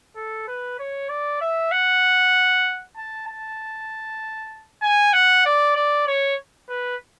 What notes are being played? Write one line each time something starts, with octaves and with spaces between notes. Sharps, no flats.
A4
B4
C#5
D5
E5
F#5
A5
A5
G#5
F#5
D5
D5
C#5
B4